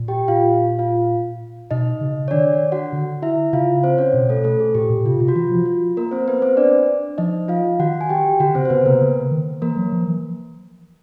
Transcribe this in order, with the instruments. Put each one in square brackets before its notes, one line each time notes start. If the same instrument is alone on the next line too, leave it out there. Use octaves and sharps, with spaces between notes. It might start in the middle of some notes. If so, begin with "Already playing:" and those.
Already playing: [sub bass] A#2
[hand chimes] G4 G5
F4 F5
F4 F5
[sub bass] B2 [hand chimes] D#4 D#5
[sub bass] C#3
[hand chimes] C#5
[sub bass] D#3 [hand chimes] D4 D5
[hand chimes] F#4 F#5
[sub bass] D3
[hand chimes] E4 E5
[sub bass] C#3 [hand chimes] F4 F5
[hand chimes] C4 C5
C#4 C#5
[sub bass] B2
[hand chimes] A3 A4
A3 A4
G#4
[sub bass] A#2 [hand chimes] G4
[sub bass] A#2
[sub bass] C3 [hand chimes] F4
[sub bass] C3 [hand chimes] F4
[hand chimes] F#4
[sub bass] E3 [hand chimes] F4
[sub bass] F3
[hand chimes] F4
A#3 A#4
C4 C5
B3 B4
C4 C5
D4 D5
[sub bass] F3 [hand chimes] D#4 D#5
[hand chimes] F4 F5
[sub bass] D#3 [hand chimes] F#4 F#5
[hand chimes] G#5
G4 G5
[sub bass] D3 [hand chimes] F#4 F#5
[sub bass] C#3 [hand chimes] C4 C5
[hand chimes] C5
[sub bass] C#3 [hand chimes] B3 B4
[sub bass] C3 [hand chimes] A#3 A#4
[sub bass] C#3
D#3
[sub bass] E3 [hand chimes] A#3 A#4
[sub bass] F#3
F3
E3